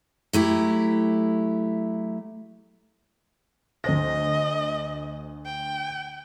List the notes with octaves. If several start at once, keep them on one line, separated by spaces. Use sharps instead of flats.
F#3 A3 E4 G4
D2 C5 D#5 A#6
G5